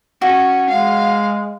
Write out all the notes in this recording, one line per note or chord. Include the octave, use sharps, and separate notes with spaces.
C#4 F#4
G#3 F5